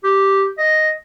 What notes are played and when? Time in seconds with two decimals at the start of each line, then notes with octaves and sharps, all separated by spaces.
0.04 G4
0.58 D#5